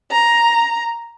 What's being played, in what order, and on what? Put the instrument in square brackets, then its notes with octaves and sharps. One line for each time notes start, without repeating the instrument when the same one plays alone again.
[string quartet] A#5